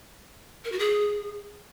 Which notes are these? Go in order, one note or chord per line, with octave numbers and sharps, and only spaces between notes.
A#4
F#4
G#4